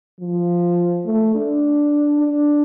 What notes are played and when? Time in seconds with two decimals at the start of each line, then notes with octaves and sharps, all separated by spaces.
0.20 F3
1.05 A3
1.35 D4
2.19 D4